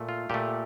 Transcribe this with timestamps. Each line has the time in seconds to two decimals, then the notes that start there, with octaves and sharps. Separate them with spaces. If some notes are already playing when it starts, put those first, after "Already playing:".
Already playing: A#2 A3
0.09 F4
0.30 A#2 A3 G4